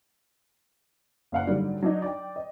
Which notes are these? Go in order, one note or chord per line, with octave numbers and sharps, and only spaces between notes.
F#1 F5 F#5
G#2 D3 F#3 G3
F#3 D4 D#4
D5 G5
D#5